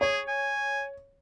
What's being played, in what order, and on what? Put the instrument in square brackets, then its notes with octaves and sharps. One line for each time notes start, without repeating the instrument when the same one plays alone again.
[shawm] G#4 [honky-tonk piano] C#5
[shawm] G#5